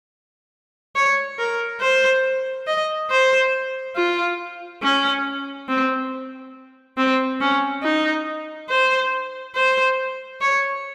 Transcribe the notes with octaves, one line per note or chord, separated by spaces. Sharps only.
C#5
A#4
C5
D#5
C5
F4
C#4
C4
C4
C#4
D#4
C5
C5
C#5